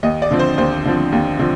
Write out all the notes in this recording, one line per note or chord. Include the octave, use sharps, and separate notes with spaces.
D#2 D#5
D5
D3 F3 C4
C5
D#2 C5
D3 F3 C4
D#2
D3 F3 C4